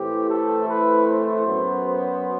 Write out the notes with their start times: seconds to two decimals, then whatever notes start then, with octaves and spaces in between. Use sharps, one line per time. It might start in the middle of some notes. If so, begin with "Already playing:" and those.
Already playing: A2 E3 A3 C4 G4
0.28 A4
0.68 B4
1.07 C5
1.47 F#2 F#3 B3
1.85 C5